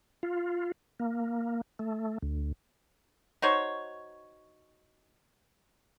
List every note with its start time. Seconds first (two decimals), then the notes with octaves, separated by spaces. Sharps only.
0.23 F4
1.00 A#3
1.79 A3
2.22 D2
3.42 D#4 F#4 C5 C#5